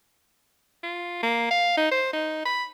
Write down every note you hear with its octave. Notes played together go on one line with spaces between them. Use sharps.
F4
A#3
F5
D#4
C5
D#4
B5